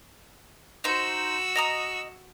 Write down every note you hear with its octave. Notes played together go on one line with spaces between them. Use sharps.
D#4 F#4 C5 E6
D#5 A#5 D#6